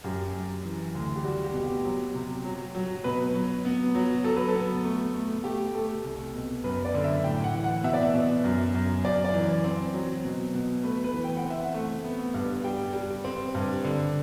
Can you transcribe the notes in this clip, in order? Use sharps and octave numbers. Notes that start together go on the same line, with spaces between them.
F#2 G4
F#2
E3
D2
G4
G3 F#4
G4
B2
G4
F#3
C3
F#3
F#3
B2 B4
F#3
B3
F#3
F#3 A4
B4
A4
B3
A3
A3
A3 G4
A3 A4
C2
B2
F#2 B4
D5
D3
E5
A2 G5
F#5
E3
F#5
B2 E5
D5
E5
B2
F#2
F#2
F#2 D5
D5
E3
C4
F#3
B2
B2
A3 B4
B4
E3
G5
F#5
C4
E5
F#5
A3
B3
G2
G3 G5
G3
C4
G2
D3